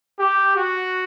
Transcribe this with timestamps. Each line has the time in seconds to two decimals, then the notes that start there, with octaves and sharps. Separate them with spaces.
0.19 G4
0.56 F#4